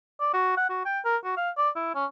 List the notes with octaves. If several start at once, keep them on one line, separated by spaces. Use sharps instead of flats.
D5
F#4
F#5
F#4
G5
A#4
F#4
F5
D5
E4
C#4